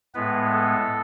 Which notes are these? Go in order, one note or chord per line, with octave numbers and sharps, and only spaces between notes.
A2 G#3 B3 B4
A4